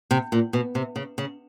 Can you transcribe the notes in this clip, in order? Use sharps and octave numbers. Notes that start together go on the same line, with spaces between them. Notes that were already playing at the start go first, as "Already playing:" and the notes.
C3
A#2
B2
C3
C#3
C#3